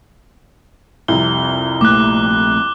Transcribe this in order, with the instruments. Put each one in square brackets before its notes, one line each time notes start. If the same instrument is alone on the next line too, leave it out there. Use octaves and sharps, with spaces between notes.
[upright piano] C2 F2 C3 [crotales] G7
[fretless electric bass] A#1 A3 A#3 [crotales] D6 F#6